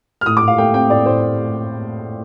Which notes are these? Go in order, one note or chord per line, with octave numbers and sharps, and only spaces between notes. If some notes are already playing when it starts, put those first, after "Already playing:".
F6
A2 D#6
D6
A2
F5
A3 G5
C4 G5
A2 D5
A2 C5